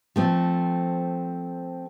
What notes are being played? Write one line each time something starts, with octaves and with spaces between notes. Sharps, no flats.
F3 A3 C4